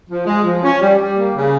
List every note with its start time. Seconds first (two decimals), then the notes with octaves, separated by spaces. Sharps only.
0.10 F3
0.27 G#3
0.44 F3
0.63 C#4
0.81 G3
0.97 G3
1.15 A#3
1.34 C#3